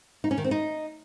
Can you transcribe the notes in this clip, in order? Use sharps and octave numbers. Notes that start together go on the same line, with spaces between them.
D#4
C#4
D#3
C4
D#4